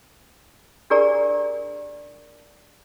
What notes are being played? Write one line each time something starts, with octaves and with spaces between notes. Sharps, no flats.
D4 G4 G#4 A#4 D5 A#5